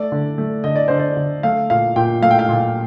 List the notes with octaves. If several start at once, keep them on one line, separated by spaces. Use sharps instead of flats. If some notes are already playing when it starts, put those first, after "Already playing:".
Already playing: A3 D5
D3
A3
D3 D#5
D5
D3 C5
D5
D3
A3 F5
A#2 F5
A#2 G5
A3 F5
G5
F5
A#2